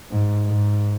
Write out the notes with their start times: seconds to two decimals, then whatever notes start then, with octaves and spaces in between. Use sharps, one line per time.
0.11 G#2
0.46 G#2